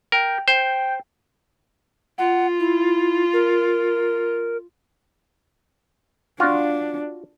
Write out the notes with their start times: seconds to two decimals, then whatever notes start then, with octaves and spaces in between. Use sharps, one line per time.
0.12 A#4 G5
0.48 C5 G5
2.18 F4 F#5
2.60 E4
3.33 A#4
6.40 D4 F4 F#4